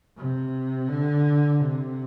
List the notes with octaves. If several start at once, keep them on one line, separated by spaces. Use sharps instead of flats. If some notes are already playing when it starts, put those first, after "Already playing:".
C3
D3
C3